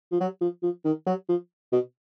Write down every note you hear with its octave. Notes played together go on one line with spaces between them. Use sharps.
F3
F#3
F3
F3
D#3
F#3
F3
B2